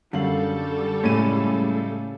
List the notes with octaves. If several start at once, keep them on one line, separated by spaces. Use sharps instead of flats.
F#2 D3 G3 A4 F5 F#7
A2 C#3 G#3 C#4 D#7